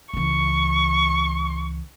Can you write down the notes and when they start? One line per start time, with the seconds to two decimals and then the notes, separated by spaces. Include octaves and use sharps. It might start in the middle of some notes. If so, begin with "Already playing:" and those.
0.14 C#2 E3 C#6